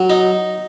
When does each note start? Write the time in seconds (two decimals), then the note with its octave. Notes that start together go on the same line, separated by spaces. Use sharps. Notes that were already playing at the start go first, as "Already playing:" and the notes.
Already playing: F#3
0.10 D#4